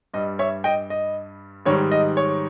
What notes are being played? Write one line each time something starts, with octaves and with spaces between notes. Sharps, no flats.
G2 G3 D#5
C#5 E5
D#5 G5
D#5
G#2 D#3 G3 C#5
D#5
C#5